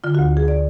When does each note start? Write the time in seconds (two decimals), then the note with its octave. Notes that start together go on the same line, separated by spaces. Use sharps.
0.04 D3 F4
0.15 F#4
0.19 D2
0.33 D2 G#4
0.48 D5